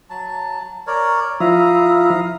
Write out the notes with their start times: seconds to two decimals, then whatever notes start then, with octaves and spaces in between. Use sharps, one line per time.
0.10 F#3 A5
0.87 A#4 C#5 D5
1.40 F3 E4 F5 A#5 D#6